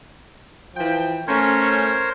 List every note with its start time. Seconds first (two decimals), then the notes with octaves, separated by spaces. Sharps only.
0.76 E3 F3 G5
1.27 A3 C#4 A#4 C5 C#5